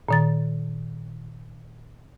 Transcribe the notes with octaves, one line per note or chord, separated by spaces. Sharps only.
A#2 D#3 A6